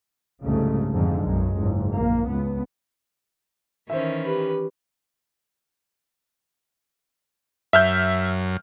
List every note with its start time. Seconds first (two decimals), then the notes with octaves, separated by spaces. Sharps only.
0.43 C2 F2 G#2 C#3 A3
0.92 F2 G#2 D3 F3
1.21 B1 F#2 G#3
1.56 F#1 C#2 G#2
1.91 A#1 A#3
2.27 C#2 B3
3.90 D#3 E3 C#4 C5 E5
4.25 G4 B4
7.73 F#2 E5 F6 G6